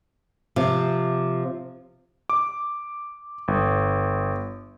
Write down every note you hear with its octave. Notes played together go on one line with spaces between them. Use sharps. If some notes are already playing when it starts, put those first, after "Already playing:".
C3 F3
D6
G1